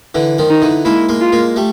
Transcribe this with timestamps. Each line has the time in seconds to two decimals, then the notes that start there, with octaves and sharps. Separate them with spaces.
0.15 D3 E3
0.38 D#3 F3
0.50 D#4
0.62 D3 E3
0.85 G#3 A#3 E4
1.09 G#3 A#3
1.21 F4
1.32 G#3 A#3
1.56 G3 A3